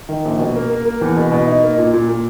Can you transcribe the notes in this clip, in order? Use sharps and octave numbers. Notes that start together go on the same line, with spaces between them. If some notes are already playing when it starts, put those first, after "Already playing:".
D#3
A#1
B2
A#3
A#3
A#3
E2
B2
B2
D#4
A#3
A#2
A#2
A#2